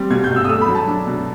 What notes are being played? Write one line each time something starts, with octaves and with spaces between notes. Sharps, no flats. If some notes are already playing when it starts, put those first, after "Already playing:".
Already playing: G3 C4
B2 G#6
G6
B2
E6
D#6
A3 E6
B5
F#3
A5
D4
B2